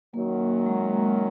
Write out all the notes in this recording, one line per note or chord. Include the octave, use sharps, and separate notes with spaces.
F#2 D#3 F#3 A#3
G#3